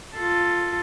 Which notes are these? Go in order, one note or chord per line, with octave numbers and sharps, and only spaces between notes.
F4 A4